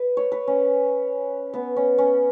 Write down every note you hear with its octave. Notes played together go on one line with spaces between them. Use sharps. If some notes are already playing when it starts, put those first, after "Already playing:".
Already playing: B4
C#5
B4
C#4
B3
C#4
C#4